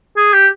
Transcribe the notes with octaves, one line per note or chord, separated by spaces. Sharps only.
G#4
G4